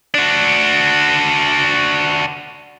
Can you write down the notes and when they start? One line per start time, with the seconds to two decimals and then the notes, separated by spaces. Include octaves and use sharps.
0.14 D4 F#4